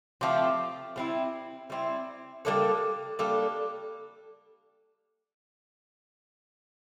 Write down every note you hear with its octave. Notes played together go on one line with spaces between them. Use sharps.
F3 A3 C4 G4
G3 C4 E4
G3 C4 E4
G3 A#3 D4 A4
G3 A#3 D4 A4